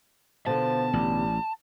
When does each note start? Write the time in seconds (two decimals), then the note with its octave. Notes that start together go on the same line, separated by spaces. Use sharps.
0.46 B2 D3 F3 A5
0.93 A1 G3